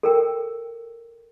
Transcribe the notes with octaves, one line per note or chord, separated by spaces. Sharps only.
A4 A#4 G5